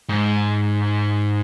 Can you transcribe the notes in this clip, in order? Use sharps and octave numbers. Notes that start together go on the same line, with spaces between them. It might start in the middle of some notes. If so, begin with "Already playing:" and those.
G#2